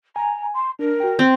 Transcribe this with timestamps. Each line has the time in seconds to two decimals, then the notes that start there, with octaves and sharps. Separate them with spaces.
0.16 G#5 A#5
0.54 C6
0.79 D4 A#4
1.00 F#4 G5
1.19 C4